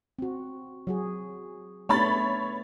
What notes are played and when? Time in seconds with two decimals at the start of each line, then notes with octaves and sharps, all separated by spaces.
0.19 C4 F#4
0.87 F#3 F#4 G#4
1.89 A3 B3 D4 C#5 B5 A6